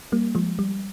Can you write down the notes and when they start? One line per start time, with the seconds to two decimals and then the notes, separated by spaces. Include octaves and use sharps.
0.12 G3 A#3
0.35 F3 G#3
0.59 G3